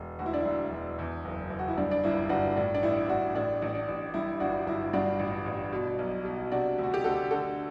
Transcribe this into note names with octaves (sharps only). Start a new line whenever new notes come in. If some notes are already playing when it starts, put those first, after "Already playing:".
Already playing: E1
D2 F#4
E4
D4
E1 E4
E1
E2
F#1
F#1
F#4
E4
G2 D4
D4
G1 E4
G1 D4 F#4
A2 D4
D4
A1 E4
A1 D4 F#4
A2 D4
A1
D4
A1
G2 E4
G1 D4 F#4
G1 E4
G2 D4 F#4
A1
A1
B2
B1
B2
C3 D4 F#4
D2 F#4
G4
D2 F#4 A4
D3 F#4 A4